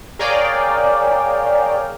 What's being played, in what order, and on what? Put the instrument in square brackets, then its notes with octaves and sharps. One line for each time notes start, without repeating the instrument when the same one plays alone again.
[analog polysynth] G#4 A#4 C#5 D5 F5 G5